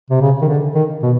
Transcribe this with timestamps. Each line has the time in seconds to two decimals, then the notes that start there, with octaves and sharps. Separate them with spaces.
0.10 C3
0.21 C#3
0.41 D#3
0.48 D3
0.75 D#3
1.02 B2